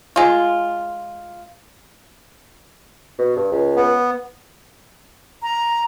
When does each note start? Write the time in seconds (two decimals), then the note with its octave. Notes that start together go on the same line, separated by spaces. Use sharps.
0.16 G#3 F4
3.19 B2
3.36 G2
3.52 C#2
3.76 B3
5.43 A#5